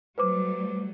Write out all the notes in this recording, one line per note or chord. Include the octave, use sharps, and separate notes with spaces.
F#3 G3 A3 B4 C5 D6